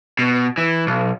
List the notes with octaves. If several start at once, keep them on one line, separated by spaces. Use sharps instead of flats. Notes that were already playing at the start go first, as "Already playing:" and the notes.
B2
E3
B1